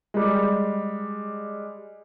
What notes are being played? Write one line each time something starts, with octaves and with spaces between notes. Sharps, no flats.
G3 G#3